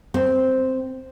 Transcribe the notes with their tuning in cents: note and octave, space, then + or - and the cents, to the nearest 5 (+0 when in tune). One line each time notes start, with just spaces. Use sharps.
C4 -5